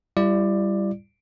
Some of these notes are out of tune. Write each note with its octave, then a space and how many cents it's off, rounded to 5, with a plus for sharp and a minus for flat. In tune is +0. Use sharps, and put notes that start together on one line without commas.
G3 +0 E4 +40 D5 +15